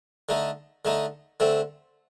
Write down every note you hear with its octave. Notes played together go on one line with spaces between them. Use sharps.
D3 A3 D#4
D3 A3 D#4
D3 A3 C4